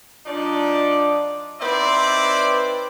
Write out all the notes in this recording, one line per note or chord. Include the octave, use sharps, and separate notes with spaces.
F3 D4 D#4 D5
C4 D#4 E4 B4 C5 D5